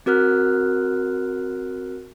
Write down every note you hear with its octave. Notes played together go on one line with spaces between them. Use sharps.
C4 F#4 A#4 F6 F#6